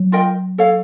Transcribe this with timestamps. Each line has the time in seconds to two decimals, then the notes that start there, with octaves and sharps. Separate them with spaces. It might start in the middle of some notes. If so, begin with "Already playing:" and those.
Already playing: F#3
0.12 F4 A#4 D#5 G5
0.58 A4 C#5 F5